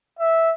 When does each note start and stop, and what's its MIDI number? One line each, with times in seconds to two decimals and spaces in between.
0.19 0.52 76